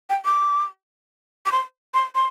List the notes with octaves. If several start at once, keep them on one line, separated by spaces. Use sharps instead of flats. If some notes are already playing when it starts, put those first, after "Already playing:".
G5
D6
D6
C6
C6
C6